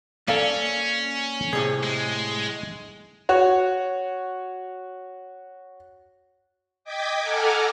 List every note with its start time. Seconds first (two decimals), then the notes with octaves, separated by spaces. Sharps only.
0.28 A#3 C#4 A4 D5 F5
1.53 C2 A2 C3 G#4
1.84 G#3
3.29 F#4 C#5
6.84 D#5 G5 D6 G#6 B6
7.22 A4 F#5 G#5 A#5 D6 F6